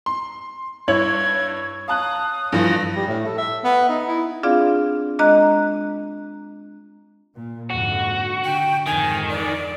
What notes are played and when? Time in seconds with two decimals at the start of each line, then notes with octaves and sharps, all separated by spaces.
0.06 C6
0.88 G2 E4 C#5 G#6 F#7
1.88 F5 A5 D#6 F#6
2.52 G2 E3 F3 A#6
2.95 G3
3.07 A2
3.25 A4
3.38 E5
3.64 B3
3.89 D#4
4.07 E4
4.43 C4 D4 F4 G#4 D5 F5
5.19 G#3 D4 D#5 A#5 F#6
7.35 A#2
7.70 F2 G#2 D3 F#4
8.44 D3 G5
8.86 F2 G#2 D#3 G#5
9.30 D5